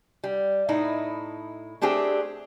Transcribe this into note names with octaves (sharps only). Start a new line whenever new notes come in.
G3
A2 D#4 E4
A3 C4 D4 G4 G#4